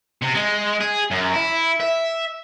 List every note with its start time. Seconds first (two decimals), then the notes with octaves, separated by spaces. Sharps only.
0.22 C3
0.34 G#3
0.81 G#4
1.11 F#2
1.34 E4
1.80 E5